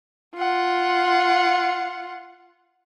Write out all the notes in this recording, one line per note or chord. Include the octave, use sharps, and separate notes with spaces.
F4 F#5